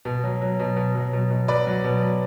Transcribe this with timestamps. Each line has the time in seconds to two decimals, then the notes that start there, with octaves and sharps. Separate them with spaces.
0.05 B2
0.23 F#3
0.42 F#3
0.59 B2
0.76 B2
0.95 F#3
1.13 B2
1.30 B2
1.48 F#3 B4 D5
1.67 F#3
1.84 B2
2.02 F#3